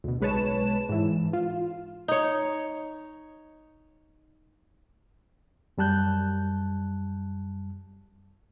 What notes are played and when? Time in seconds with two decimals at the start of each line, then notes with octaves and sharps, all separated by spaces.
0.04 D2 B2
0.21 B1 G#3 B4 C#5 A5 E7
0.89 G#2 E3
1.33 F4
2.08 D#4 C#5
5.78 F#2 G3 A5 F#6 G6